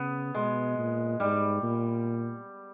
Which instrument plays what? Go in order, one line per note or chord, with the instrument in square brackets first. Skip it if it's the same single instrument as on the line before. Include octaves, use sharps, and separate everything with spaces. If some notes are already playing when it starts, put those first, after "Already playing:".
Already playing: [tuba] C#3 [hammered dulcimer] B3
[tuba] B2 [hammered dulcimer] G#3
[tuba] A#2
[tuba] G#2 [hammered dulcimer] G3
[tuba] A#2